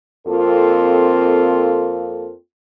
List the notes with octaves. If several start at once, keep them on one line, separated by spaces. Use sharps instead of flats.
F2 A#3 C4 F4 A4